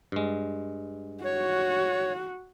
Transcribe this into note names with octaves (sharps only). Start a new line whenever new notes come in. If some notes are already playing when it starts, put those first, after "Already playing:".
G2 G#3
F#4 C#5